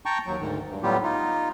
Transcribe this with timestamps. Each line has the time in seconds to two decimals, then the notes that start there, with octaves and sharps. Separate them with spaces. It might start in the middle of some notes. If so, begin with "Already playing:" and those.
0.06 G5 A5 A#5 C#6
0.26 D#2 F#3
0.40 D2 G#2 D#3
0.70 G2
0.83 A2 F#3 G3 B3 F4 G4
1.03 D#4 F4